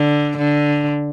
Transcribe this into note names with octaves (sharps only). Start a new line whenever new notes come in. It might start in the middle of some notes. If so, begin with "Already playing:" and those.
Already playing: D3
D3